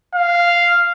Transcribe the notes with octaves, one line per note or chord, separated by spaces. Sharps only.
F5